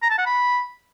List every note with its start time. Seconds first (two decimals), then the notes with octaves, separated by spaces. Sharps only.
0.02 A#5
0.10 A5
0.18 F#5
0.26 B5